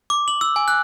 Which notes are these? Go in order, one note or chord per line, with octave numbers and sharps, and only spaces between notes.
D6
F#7
E6
G#5
F#6